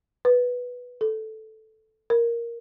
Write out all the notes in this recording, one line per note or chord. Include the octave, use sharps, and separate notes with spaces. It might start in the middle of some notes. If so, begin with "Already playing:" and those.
B4
A4
A#4